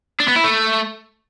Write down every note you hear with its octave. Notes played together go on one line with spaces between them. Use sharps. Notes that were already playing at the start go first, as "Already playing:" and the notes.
D4
B3
E4
A3